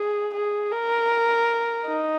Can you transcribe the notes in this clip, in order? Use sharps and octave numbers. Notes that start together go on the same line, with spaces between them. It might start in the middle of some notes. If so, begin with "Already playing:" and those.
Already playing: G#4
G#4
A#4
D#4